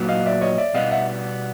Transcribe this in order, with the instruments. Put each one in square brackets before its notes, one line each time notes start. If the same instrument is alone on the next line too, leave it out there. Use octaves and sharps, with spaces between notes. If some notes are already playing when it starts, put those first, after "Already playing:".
Already playing: [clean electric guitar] A#2 F#3 B3
[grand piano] D#5 F5
D5 E5
C#5 D#5
D5 E5
[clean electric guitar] B2 G3 B3 [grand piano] D#5 F5
[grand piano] E5 F#5